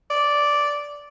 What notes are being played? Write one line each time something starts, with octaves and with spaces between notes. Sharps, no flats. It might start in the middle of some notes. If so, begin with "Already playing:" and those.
D5